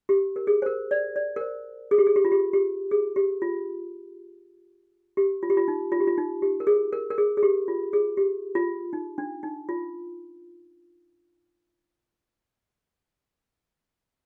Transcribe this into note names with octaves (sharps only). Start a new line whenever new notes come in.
G4
A#4
G#4
C5
A#4
D5
D5
A#4
C5
G#4
G4
G#4
G4
F4
G4
G4
G#4
G4
F4
G4
F4
G4
F4
D#4
F4
G4
F4
D#4
G4
A#4
G#4
A#4
A#4
G#4
G#4
G4
F4
G#4
G4
F4
D#4
D4
D#4
F4